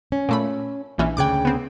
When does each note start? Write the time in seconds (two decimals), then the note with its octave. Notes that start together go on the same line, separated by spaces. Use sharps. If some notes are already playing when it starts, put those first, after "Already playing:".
0.12 C#4
0.29 A#2 A3 B5
0.98 A#1 E3 C#4
1.17 D2 C#3 G5 D6 F#6 G#6
1.45 B3 C4